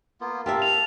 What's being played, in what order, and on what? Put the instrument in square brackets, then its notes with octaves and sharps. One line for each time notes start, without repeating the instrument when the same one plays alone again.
[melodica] A#3 B3 F4
[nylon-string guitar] G4 A#4 E5 [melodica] F5 A5
[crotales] F7